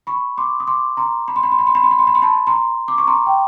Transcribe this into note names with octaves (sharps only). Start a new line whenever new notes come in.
B5 C#6
C6 D6
D#6
C6 D6
A#5 C6
B5
C6
B5
C6
B5
C6
B5
C6
B5
C6
B5
C6
A5 B5
A#5 C6
D6
C#6
A#5 C6
G5